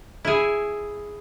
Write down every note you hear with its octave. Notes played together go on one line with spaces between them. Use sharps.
E4 G#4